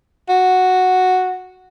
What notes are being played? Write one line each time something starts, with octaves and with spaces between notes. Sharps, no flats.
F#4